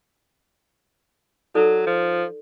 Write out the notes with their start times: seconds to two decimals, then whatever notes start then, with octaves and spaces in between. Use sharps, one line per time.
1.55 F#3 D#4 A4 D5
1.86 F3